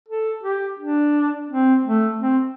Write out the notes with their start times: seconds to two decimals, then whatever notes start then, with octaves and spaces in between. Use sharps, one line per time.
0.08 A4
0.43 G4
0.79 D4
1.49 C4
1.84 A3
2.21 C4